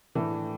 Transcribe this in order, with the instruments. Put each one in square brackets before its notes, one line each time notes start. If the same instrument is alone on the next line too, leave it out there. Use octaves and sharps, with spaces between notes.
[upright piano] A2 E3 A3 D4